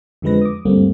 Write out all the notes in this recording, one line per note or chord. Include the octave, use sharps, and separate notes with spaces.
F2 D3 F3 G#3 B4 A#6
D6 D#6
D2 G2 G3 A3 A#3 C4